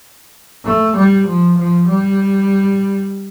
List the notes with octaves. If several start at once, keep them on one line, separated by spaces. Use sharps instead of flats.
A3
G3
F3
F3
G3